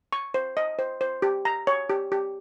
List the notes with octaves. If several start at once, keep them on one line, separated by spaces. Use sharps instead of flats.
C#6
C5
D#5
C5
C5
G4
A#5
C#5
G4
G4